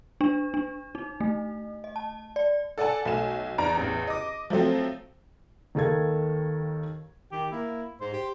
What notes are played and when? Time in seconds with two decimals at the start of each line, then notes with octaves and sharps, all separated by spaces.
0.21 D4
0.54 D4
0.95 D#4
1.20 A3
1.84 D#5
1.96 A5
2.36 D5
2.78 A4 D5 F#5 G#5 A5
3.05 B1 A3 G#5 E7
3.58 E2 D5 A#5 D7
3.77 A1 E2
4.07 D#5 D6
4.50 F3 F#3 A3 C4
5.75 D#2 D#3 A4 F5 G#6
7.32 D#3 G4
7.51 A#3 E4
8.01 G#2 C5
8.13 G4